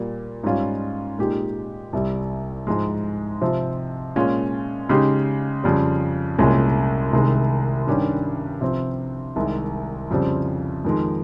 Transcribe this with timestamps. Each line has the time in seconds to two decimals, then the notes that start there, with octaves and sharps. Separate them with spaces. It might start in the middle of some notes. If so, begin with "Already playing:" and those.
Already playing: A#2 G3 A#3
0.44 G#2 G3 C#4 F4
1.19 A#2 G#3 D#4 G4
1.93 C2 C3 G3
2.67 G#2 F3 G#3
3.41 C3 F3 C4
4.16 A#2 G#3 C#4 F4
4.89 C#3 G#3 D#4 G4
5.64 F2 C#3 G3
6.38 C2 A#2 G#3 C#4
7.13 C2 C3 D#3 G#3
7.87 G2 D#3 G3 C#4 G4
8.61 C3 F3 C4
9.36 C2 C3 D#3 G#3
10.11 F2 C#3 G3 C4
10.85 F2 D#3 G#3